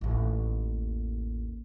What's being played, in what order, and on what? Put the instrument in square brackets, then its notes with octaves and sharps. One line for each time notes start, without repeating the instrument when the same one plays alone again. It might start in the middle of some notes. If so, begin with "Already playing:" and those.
[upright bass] A1 D#2